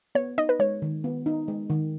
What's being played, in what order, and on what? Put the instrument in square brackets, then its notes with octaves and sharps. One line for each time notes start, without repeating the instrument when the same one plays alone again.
[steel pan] B3 [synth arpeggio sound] C#5
[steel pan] D#4 [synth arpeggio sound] D#5
[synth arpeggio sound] B4
[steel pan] G#3 [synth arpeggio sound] C#5
[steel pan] D#3
B3
D#4
G#3
D#3